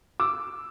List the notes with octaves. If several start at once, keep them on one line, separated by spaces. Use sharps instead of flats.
D6 E6